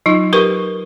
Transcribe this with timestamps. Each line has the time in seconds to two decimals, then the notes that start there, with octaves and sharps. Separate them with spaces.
0.06 F#3 D#4 F4
0.33 G4 A#4 B4 C#6